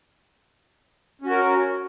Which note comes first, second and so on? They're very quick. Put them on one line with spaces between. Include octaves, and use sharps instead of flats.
C#4 F#4 A#4